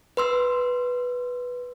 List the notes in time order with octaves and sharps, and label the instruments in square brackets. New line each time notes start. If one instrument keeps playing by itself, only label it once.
[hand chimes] B4 C6 E6